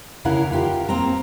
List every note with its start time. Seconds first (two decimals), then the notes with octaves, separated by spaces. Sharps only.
0.25 D2 C#3 E4 A#4 F#5
0.51 F4 G4 A#4
0.89 A#3 C4 A#5